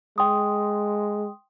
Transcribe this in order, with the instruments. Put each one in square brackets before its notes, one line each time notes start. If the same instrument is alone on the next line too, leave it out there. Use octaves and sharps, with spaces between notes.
[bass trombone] G#3 [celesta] G5 C6 D#6